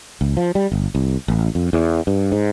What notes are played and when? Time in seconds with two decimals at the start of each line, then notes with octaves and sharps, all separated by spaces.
0.21 C#2
0.37 F3
0.55 G3
0.72 G1
0.95 C2
1.28 A1
1.55 F2
1.73 E2
2.07 G2
2.32 G#2